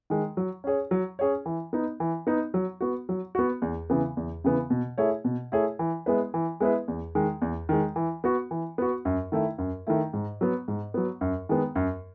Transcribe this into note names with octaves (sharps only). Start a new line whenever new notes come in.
D#3 G#3
F#3
C#4 G#4 C#5
F#3
C#4 G#4 C#5
E3
B3 D#4
E3
B3 D#4
F#3
B3 F#4
F#3
B3 F#4
E2
C#3 E3 B3
E2
C#3 E3 B3
B2
A3 E4 G#4 C#5
B2
A3 E4 G#4 C#5
E3
G#3 B3 E4 B4
E3
G#3 B3 E4 B4
E2
D#3 G#3
E2
D#3 G#3
E3
B3 F#4
E3
B3 F#4
F#2
D#3 A3 E4
F#2
D#3 A3 E4
G#2
F#3 B3
G#2
F#3 B3
F#2
D#3 G#3 B3
F#2